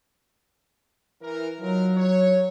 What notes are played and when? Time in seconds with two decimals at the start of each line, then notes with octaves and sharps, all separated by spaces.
1.22 E3 A#4
1.60 F#3 D#4 F4 A#4
1.97 C#5